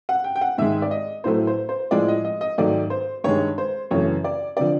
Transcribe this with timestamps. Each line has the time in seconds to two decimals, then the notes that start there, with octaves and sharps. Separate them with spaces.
0.09 F#5
0.24 G5
0.36 G5
0.41 F#5
0.58 G#2 D#3 G#3 E5
0.82 D5
0.91 D#5
1.24 A2 F#3 A3 C5
1.47 C5
1.69 C5
1.91 A2 F3 G#3 D5
2.08 D#5
2.25 D#5
2.41 D#5
2.58 G#2 D#3 F#3 A3 D5
2.90 C5
3.24 G2 D#3 G#3 C#5
3.58 C5
3.91 F#2 C#3 E3 A3 C#5
4.24 D5
4.57 D3 F3 D5